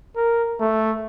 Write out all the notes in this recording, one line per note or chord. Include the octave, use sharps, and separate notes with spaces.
A#4
A3